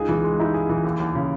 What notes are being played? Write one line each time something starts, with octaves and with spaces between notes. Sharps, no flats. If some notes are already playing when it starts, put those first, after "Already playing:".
Already playing: C#2 D#4 G#4
E3
G#3
D#4 E4
G#4
E3
D#2
D#2
C#3